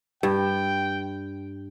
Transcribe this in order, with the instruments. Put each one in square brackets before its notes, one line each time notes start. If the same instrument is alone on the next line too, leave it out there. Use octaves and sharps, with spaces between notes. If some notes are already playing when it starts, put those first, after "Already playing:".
[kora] G2 [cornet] G5